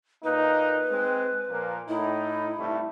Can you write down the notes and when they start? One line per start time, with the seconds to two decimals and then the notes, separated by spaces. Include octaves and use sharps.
0.24 A#2 A#3 D#4 B4
0.90 G#3 C4
1.49 A#2 F3 A#3
1.89 A2 D#4 E4
2.58 G2 C3 A3